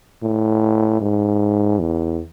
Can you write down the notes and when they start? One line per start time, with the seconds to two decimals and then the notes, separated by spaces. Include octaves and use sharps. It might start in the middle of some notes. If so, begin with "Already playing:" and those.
0.23 A2
1.01 G#2
1.79 E2